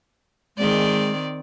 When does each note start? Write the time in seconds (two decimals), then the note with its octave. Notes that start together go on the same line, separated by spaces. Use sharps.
0.57 D#3 G#3 C4 D5